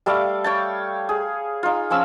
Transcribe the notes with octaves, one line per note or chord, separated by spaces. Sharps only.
G3 A3 F5 D6
C#5 G5 A5
G#4
D#4 F4
F3 C#4 E6